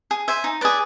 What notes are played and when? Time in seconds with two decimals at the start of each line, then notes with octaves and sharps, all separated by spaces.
0.11 G#4
0.28 C5 E5 G#5
0.44 D#4
0.61 G#4 B4 D5